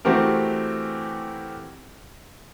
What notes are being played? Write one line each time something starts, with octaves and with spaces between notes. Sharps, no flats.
E3 A3 C4 F#4 G4 A#4